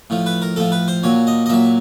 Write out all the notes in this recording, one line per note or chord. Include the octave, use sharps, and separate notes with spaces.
A2 F3
B4
A#4
A2 F3 A4
B4
C5
A#2 F#3 C#5
D#5
D#5
A#2 F#3 E5